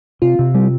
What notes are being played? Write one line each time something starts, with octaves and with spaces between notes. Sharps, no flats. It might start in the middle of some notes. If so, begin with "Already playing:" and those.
C3 F4
C3
G3